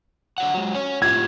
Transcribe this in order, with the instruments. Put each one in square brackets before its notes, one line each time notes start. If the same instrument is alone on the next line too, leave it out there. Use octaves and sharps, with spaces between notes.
[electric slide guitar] D3 F#3 F#5
F#3 G#3
C#5 G#5
[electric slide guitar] A2 F4 G4 [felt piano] G#6